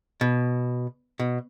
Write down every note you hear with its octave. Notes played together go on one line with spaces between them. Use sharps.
B2
B2